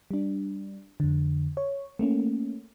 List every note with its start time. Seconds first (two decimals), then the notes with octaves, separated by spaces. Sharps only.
0.11 G3 D4
1.00 F2 D3
1.57 C#5
1.99 A3 A#3 C#4